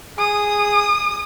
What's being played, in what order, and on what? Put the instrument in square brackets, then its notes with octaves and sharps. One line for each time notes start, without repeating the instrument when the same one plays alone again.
[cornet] G#4 [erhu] D#6